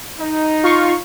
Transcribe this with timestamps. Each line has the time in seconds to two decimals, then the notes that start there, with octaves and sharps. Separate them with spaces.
0.20 D#4
0.63 F4 F5 C#6